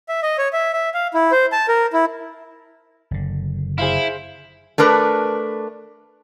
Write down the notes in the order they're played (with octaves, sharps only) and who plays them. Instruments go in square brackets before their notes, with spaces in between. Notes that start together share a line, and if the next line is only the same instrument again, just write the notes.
[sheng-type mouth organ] E5
D#5
C#5
E5
E5
F5
E4
C5
A5
A#4
E4
[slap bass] F#1 D3
[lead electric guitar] E4 [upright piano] G#4 C5 F5
[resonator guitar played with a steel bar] A3 D4 A#4 B4